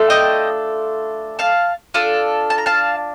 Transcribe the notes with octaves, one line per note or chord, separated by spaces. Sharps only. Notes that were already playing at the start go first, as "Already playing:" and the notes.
Already playing: A3 D4 F4 A4
D#5 G5
F5 A5
D4 F4 A4
A5
A#5
F5 A5